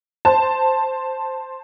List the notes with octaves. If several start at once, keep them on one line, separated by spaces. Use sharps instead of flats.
C5 A5